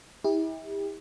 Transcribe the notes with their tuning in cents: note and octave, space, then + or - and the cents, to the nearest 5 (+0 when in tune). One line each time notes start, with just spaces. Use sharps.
E4 -35 G4 +35